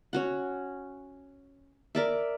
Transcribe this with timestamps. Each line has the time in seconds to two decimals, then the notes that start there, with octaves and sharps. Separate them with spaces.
0.13 C#4 F#4 F#5
1.95 A#4 D5 E5